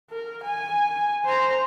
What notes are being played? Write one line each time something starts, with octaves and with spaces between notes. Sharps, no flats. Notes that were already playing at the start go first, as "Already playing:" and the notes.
A#4
G#5
C5 A#5